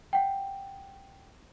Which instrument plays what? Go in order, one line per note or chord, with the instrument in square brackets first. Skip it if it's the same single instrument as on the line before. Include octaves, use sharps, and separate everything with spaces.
[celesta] F#5 G5